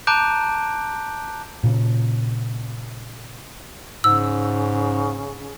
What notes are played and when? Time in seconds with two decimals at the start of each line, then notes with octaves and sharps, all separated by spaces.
0.07 A5 A#5 D6 F#6 G6 D7
1.64 A#2 C#3
4.04 G#2 C#3 E6